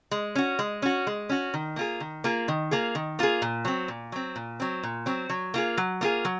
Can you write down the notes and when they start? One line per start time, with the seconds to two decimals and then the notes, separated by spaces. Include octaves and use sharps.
0.11 G#3
0.35 C#4 F#4
0.59 G#3
0.82 C#4 F#4
1.07 G#3
1.29 C#4 F#4
1.54 D#3
1.76 A#3 F4 G#4
2.00 D#3
2.24 A#3 F4 G#4
2.48 D#3
2.71 A#3 F4 G#4
2.95 D#3
3.19 A#3 F4 G#4
3.42 A#2
3.65 F#3 C4
3.88 A#2
4.12 F#3 C4
4.36 A#2
4.60 F#3 C4
4.83 A#2
5.06 F#3 C4
5.30 F#3
5.54 A#3 F4 G#4
5.77 F#3
6.01 A#3 F4 G#4
6.25 F#3